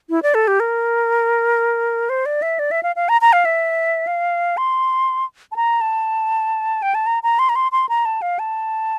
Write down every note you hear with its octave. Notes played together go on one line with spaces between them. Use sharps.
E4
D5
A4
G4
A#4
C5
D5
E5
D5
E5
F5
F5
A#5
A#5
F5
E5
F5
C6
A5
A#5
A5
G5
A5
A#5
A#5
C6
A#5
C6
C6
A#5
A5
F5
A5